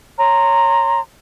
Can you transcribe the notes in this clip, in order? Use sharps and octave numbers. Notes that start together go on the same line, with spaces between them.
C#5 A#5 C6